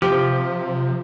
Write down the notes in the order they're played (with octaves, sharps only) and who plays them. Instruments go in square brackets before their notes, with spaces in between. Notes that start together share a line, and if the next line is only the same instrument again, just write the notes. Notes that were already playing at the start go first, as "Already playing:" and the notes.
[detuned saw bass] C3 [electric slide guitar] F3 [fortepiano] G4